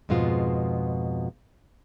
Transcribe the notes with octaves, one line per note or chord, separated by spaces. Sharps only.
F2 G#2 B2 G#3 B3 F4